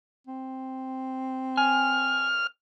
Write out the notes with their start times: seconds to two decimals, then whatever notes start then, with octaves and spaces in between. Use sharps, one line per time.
0.27 C4
1.57 G#5 F6